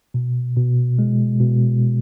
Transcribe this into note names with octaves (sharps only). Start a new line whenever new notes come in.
B2
B2
G#3
B2